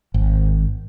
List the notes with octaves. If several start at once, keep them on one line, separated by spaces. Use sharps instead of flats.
G#1